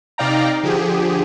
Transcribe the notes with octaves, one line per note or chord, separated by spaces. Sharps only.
C3 D#4 D5 F5 G5 A#5
D3 F3 G4 G#4